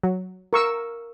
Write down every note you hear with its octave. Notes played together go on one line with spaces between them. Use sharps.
F#3
A#4 C#6 E6